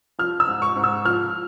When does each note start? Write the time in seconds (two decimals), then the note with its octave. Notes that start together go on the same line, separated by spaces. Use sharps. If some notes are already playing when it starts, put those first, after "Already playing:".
0.19 F3 F6
0.40 E6
0.47 G#2
0.62 C#6
0.76 G#2
0.84 E6
1.05 F3 F6